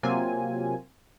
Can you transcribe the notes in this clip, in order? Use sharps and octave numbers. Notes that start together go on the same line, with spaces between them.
C3 F#3 A#3 C4 F4 G#5